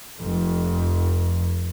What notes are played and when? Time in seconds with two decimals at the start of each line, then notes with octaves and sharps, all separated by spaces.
0.20 F1 F2